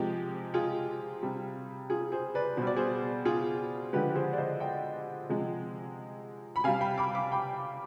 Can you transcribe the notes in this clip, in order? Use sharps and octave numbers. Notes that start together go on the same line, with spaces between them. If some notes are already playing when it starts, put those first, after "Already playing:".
Already playing: C3 F3 G#3 G4
F4 G#4
C3 G3
F4 G#4
G#4 C5
B4 D5
B2 G3 C5
D5
G#4 C5
F4 G#4
D3 F3 G#3 G4 B4
G#4 C5
D5
C5 D#5
D#5 G5
C3 F3 G#3
B5
C3 G3 F5 G#5
G5 B5
B5 D6
B5 D6
G5 B5